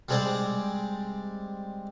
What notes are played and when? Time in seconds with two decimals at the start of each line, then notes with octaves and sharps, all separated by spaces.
0.09 G3 G#3 C4 G#4 D5 G5